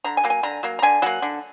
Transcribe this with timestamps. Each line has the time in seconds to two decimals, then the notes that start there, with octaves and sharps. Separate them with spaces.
0.04 D3 A#5
0.17 G#5
0.24 F#3 A#3
0.30 G#5
0.43 D3 A#5
0.63 F#3 A#3
0.79 A#5
0.83 D3 G#5
1.02 F#3 A#3 F#5
1.22 D3